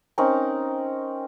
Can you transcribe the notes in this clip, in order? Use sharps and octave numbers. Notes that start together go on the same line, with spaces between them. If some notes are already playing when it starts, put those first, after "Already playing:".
C4 C#4 D#4 A#4